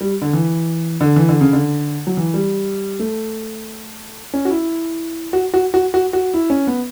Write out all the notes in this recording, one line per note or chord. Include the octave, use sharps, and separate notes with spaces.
G3
D3
E3
D3
E3
D3
C#3
D3
F#3
E3
G3
A3
C#4
F#4
E4
F#4
F#4
F#4
F#4
F#4
E4
C#4
B3